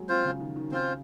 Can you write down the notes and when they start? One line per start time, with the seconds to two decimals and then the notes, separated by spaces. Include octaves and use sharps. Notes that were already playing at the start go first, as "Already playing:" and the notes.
Already playing: F#3 G#3 A#3
0.09 F3 C4 F4 C5
0.25 C#3
0.40 D#3
0.56 D#3
0.71 C#3 C4 F4 C5